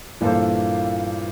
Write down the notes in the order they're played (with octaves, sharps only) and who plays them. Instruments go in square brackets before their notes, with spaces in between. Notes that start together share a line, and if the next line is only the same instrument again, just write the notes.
[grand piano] G2 A#2 [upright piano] E3 A#3 F4 A4 C5